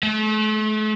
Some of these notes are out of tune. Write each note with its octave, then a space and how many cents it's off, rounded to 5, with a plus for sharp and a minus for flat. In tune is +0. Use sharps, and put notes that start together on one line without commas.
A3 -40